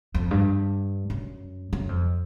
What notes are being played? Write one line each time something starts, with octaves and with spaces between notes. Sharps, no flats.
F2
G2
F#2
F#2
F2